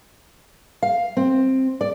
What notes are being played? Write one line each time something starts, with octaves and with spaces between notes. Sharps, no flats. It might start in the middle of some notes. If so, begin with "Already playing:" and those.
F5
C4
D5